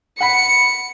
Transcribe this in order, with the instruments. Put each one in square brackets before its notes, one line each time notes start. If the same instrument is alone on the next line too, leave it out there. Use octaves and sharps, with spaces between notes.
[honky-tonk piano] F#5 B5 B6 [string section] C#7